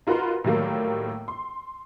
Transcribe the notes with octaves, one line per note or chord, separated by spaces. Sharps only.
D#4 F4 F#4 A#4 B4 C6
A2 D#3 F#3 G3 A3 A#3
C6